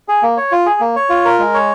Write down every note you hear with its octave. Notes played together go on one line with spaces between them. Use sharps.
G#4
A#3
C#5
F4
G#4
A#3
C#5
F4
A#4
G#3
C#5